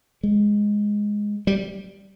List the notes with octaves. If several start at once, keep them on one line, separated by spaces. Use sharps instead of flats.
G#3
G3